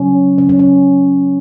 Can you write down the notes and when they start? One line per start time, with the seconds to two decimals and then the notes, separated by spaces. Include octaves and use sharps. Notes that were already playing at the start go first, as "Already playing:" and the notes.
Already playing: C#3 F#3 C#4
0.38 C#3 F#3 C#4
0.49 C#4
0.59 C#4